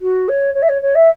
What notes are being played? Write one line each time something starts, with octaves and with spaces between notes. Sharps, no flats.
F#4
C#5
C#5
E5
C#5
C#5
E5